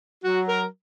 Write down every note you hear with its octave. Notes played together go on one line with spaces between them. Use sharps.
F#3 F#4
A#4